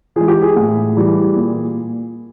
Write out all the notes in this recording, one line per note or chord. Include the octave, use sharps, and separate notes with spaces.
E3 G#3 G#4
G4
G#4
A2
E3 G3
A#2